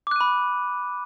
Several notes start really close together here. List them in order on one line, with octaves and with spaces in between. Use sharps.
D6 F#6 D#7 B5